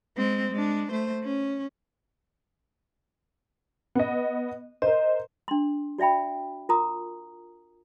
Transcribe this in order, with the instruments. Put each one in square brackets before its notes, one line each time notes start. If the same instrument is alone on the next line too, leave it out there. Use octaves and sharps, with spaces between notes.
[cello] G#3 C4
G#3 D4
A3 C5
C#4
[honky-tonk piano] B3 D#5
[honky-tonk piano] A#4 C5 [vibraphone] D#5
[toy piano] D4 C6
F#4 D5 E5 G5 B5
F4 A#4 A#5 D#6